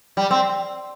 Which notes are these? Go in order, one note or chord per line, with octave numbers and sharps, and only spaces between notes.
G3
C4